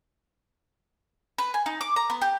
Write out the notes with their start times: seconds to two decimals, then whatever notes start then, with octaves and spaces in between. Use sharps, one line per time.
1.38 B4
1.54 G#5
1.66 D#4
1.81 D6
1.96 A#5
2.10 B3
2.22 G4